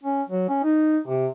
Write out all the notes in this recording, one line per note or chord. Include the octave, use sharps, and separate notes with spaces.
C#4
F#3
C#4
D#4
C3